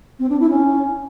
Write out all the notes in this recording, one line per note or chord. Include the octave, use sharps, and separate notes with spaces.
C4
D4
E4
C#4